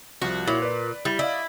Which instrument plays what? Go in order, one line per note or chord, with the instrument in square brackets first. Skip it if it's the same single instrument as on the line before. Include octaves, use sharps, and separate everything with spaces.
[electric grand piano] C2 F3 [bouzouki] F#4
[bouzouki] A#2 [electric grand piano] E4 F#4 C#5
[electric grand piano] B4 D5
[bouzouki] G3 [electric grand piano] E4
[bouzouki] E4 [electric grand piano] D5 D#5 F5